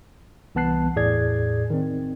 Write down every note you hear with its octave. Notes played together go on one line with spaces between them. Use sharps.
C2 E3 B3 A5 F#6 C7
E2 A2 G#4 D5 G#6
D#3 C4